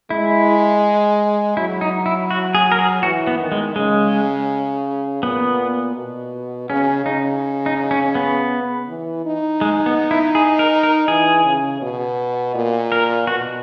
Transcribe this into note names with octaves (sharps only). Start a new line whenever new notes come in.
G#3 E4
F#3 E4
D#4
E4
F#4
G#4
A#4
G#4
E3 F#4
B3
D#3
G#3
C#3 G#3
A#2 B3
B2
C#3 C#4
C#3 D#4
D#4
C#4
B3
E3
D#4
G#3
B3
E4
G#4
A#4
A#4
E3 G#4
C#3
B2
A#2
A#4
B2 F#4